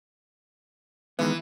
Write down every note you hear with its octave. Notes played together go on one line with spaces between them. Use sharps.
D#3 E3 G#3 B3